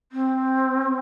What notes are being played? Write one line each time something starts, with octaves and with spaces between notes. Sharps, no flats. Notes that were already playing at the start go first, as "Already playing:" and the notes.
C4